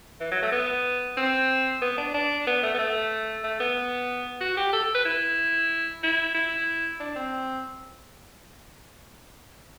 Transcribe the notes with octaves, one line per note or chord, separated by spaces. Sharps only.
E3
F#3
A3
B3
C4
B3
D4
D4
B3
A3
B3
A3
A3
B3
F#4
G4
A4
B4
E4
E4
E4
D4
C4